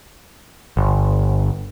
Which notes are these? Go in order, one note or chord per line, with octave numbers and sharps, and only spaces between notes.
G1